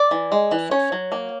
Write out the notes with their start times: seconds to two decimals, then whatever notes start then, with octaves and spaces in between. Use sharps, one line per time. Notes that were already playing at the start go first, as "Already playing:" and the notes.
Already playing: D5
0.11 E3
0.32 G#3
0.51 E3
0.71 C#4 C#5
0.92 F#3
1.12 A#3